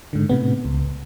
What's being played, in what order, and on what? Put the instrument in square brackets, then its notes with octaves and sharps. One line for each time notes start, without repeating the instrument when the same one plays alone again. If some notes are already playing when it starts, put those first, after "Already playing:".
[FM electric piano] G#2 D3
A2 C3 B3
C#2